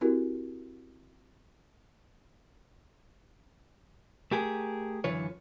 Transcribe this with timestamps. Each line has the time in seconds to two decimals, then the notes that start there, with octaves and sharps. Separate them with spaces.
0.01 C4 E4 F#4 G4 A4 A#4
4.31 A3 G4 G#4 A#4
5.04 F#2 D3 E3 F4 B4 C#5